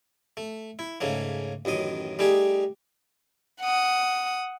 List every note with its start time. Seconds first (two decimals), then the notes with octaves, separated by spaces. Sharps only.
0.37 A3
0.79 E4
1.01 G#2 C#3 A3 A#3
1.65 A1 F#2 D#3 D#5
2.19 G3 A3 D#4 G4 G#4
3.61 F#5 D#6